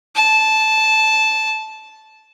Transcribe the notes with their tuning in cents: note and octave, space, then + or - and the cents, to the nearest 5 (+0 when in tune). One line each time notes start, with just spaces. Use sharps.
A5 -10